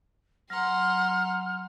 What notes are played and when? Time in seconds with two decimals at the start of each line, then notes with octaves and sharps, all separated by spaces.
0.50 F#3 F#5 A#5 C6 F6